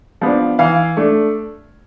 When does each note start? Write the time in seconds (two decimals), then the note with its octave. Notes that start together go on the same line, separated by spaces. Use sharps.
0.21 F3 B3 D4
0.59 E3 F5
0.97 A3 D4